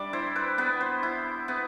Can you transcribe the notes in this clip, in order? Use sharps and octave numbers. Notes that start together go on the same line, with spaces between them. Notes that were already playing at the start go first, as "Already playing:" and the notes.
Already playing: G3 D4 D5 E5
E4 C5
B4
B3 B4
C5
E4
B3